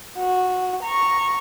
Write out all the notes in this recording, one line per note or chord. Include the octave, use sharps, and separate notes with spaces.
F#4
A#5 C#6